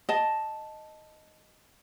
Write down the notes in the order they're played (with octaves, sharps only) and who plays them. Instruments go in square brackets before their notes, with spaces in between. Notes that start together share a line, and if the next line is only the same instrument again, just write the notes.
[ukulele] D#5 A5